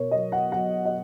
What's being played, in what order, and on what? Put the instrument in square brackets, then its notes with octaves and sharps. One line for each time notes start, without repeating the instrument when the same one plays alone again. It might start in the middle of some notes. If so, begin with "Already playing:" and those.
Already playing: [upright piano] B2 A#4 C#5
F#3 D#5
F#5
F#3 F#5
D#5